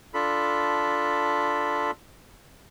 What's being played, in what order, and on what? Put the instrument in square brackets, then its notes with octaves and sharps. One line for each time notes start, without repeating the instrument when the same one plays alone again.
[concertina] D4 F4 A4 B5